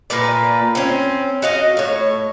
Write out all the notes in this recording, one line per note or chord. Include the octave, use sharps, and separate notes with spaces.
A#2 A#3 B4 D5
C4 C#4
F#4 D#5 F5
A2 C#5